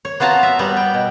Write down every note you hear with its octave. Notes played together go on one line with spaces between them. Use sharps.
C#5
B3 F4 F#4 A5 A#5
E5
G3 B3
G5
B2